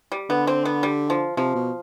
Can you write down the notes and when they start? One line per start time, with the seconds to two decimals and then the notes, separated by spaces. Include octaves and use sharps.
0.12 G3
0.29 D3 B3
0.47 C4
0.65 B3
0.83 G3
1.10 F3
1.37 C3 F3
1.55 B2